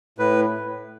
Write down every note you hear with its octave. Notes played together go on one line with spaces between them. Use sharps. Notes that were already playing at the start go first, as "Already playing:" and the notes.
A2 B4